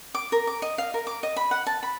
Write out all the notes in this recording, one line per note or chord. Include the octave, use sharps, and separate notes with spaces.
D6
A#4
D6
D#5
F5
A#4
D6
D#5
B5
F#5
A5
B5